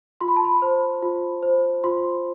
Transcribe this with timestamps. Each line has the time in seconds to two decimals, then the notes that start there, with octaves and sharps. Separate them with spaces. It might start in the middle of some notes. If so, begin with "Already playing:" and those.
0.21 F4 C6
0.28 B5
0.36 A5
0.45 B5
0.62 C5
1.02 F4
1.43 C5
1.84 F4 C6